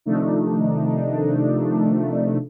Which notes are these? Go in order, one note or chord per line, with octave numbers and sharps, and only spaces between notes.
C3 D#3 F3 A3 D4 D#4